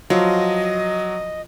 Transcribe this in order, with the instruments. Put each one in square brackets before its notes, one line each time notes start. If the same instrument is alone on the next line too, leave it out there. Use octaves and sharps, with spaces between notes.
[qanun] F3 [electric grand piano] F#3 [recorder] D#5